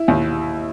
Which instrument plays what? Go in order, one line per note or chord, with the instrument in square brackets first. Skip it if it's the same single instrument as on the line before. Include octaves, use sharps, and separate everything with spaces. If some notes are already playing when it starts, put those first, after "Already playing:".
Already playing: [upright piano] E4
[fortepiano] D#2